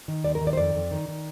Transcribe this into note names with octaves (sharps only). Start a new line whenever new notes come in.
D#3
D#2 D5
A#4
D#3
D5
C5
F2 D5
F2
D#3
D#3